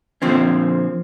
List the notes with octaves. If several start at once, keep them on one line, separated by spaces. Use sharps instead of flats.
A#2 D3 F3 C4 C#4